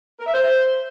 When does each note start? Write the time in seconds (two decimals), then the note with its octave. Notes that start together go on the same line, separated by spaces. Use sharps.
0.19 A#4
0.27 E5
0.34 C5